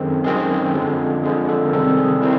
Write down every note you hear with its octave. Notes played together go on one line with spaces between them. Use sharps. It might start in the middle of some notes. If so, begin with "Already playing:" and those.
Already playing: F#2 D#3 G#3 C4 A4
F#2 D#3 G#3 C4 G#4
F2 D3 F3 G#3
F2 D3 F3 G#3 G#4
A4
A#4
C3 D#3 G3 C4 A4
G#4
C3 D#3 G3 C4 E4